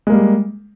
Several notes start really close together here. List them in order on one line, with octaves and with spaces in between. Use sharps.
G#3 A#3 G3